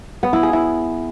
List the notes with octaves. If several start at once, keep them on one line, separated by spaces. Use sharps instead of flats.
B3
E4
G#4
E4